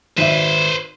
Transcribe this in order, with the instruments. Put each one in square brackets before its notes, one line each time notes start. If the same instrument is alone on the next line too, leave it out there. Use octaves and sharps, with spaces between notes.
[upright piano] G#1 E5 [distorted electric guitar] B4 C5